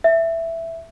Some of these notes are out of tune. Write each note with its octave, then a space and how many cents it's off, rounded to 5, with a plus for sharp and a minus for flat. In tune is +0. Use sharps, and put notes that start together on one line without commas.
E5 +5